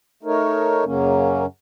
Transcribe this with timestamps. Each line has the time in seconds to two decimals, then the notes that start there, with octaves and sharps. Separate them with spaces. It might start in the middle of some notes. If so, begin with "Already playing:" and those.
0.23 A3 D#4 A#4 C#5
0.84 F#2 C#3 F#3 A#3 C#4